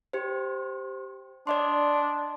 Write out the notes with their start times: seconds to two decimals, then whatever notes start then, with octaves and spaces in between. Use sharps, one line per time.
0.13 G4 C5
1.47 D4 D5 D#5 C6